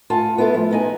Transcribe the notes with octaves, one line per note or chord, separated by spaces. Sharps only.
A2 F4 F#5 G#5 A5
B3 E4 F4 A4
F3 A3
B3 D#4 G#5